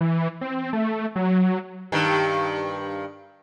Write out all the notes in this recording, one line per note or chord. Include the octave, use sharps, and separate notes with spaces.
E3
C4
A3
F#3
G2 D#3